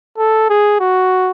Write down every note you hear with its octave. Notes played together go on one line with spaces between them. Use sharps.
A4
G#4
F#4